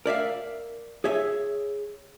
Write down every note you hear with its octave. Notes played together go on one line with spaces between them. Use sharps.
A#4 D5 E5 F5
G#4 C#5 E5